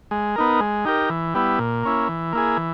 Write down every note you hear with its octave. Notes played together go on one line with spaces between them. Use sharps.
G#3
B3 D#4 A#4
G#3
D#4 G4 A#4
E3
G3 B3 E4
A#2
A#3 C#4 E4
E3
A#3 E4 G#4
E3